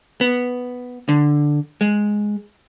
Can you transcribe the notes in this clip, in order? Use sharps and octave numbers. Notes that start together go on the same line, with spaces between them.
B3
D3
G#3